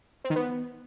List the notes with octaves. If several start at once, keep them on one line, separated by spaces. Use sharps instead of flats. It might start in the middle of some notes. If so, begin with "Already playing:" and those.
C4
D#3
B3